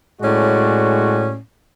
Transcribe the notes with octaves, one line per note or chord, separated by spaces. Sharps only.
A2 G#3 C#4 F#4 D5